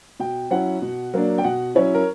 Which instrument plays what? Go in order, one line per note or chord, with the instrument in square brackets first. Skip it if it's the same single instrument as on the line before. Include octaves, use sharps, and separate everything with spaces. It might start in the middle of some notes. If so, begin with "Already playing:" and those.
[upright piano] B2 G5
F#3 C#4 E4 F#5
B2
F#3 A#3 D4
G5
B2 F#5
F#3 C#4 E4 C#5
A#4